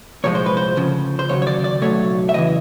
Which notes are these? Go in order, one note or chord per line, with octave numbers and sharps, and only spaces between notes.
C2 A#2 F3 G#3 C#5
C5
B4
C5
D2 C#3 F3
C5
D#2 C#3 F#3 C#5
C#5
D5
D5
B1 A2 F#3 A3 C#5
E5
E2 C#3 E3 D#5